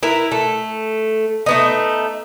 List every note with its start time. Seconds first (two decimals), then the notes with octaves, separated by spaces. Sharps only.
0.03 E4 A#4 B4
0.32 A3
1.46 A3 B3 D#4